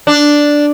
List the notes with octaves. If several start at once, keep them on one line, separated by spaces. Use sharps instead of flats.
D4